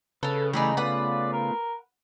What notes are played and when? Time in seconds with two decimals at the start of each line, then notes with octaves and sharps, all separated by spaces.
0.23 C#3 C#4 A4 B4
0.53 E3 G3 A3 D#4 G#4 B4
0.77 A3 B3 F4 B4 D5 F#5
1.33 A#4